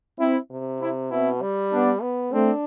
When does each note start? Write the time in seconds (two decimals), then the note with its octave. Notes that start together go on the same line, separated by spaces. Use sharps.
0.19 C4 E4
0.50 C3
0.80 C4 E4
1.11 B2 C4 E4
1.42 G3
1.72 B3 D4
2.02 B3
2.33 A3 C4 D4